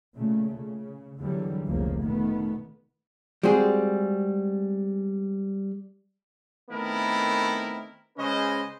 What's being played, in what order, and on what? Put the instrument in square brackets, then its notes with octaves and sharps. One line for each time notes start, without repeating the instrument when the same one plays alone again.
[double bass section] A#2 C#3 A3
C#3
E2 D3 E3 F#3 G3
F1 C#2 C#3 F3 A#3
A#2 D#3 A3 B3
[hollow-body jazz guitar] G3 G#3 C4 F#4 G#4
[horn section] D#3 A3 B3 C4 E4 A#4
C#3 G#3 C#4 B4 C5 D#5